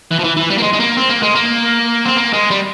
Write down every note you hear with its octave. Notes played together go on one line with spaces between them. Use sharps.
E3
F3
E3
E3
G3
A#3
G#3
G#3
A#3
C4
A#3
G#3
A#3
C4
A#3
G#3
G3